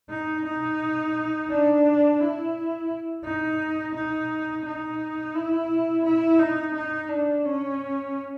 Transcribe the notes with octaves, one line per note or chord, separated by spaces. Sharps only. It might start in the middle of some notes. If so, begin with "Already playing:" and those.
D#4
D#4
D4
E4
D#4
D#4
D#4
E4
E4
D#4
D#4
D4
C#4